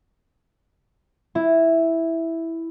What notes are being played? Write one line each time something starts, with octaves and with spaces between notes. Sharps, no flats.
E4